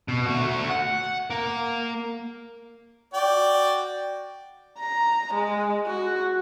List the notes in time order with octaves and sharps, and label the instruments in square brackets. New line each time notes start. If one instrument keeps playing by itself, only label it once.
[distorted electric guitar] B2
A3 F#4
F#5
A#3
[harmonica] F#4 D5 G5
[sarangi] A#5
G#3
F#4